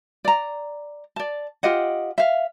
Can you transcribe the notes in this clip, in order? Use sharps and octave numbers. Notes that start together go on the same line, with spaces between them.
D5 A#5
D5 A5
F4 G4 D#5 F#5
E5 F5